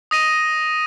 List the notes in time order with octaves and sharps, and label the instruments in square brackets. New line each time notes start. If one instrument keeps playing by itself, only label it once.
[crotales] D#6 A#6 D#7